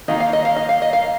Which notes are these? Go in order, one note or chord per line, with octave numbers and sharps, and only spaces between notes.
D#3 A#3 D#4 D#5
F5
D#5
F5
D#5
F5
D#5
F5